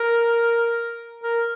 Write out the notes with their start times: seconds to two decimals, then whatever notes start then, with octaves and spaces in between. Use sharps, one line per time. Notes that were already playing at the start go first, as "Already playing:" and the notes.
Already playing: A#4
1.23 A#4